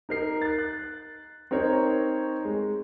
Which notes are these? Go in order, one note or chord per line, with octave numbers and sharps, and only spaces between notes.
D#4 A#4 C7
F#6 A6
F#6
C4 D#4 A#4 C#5
G#3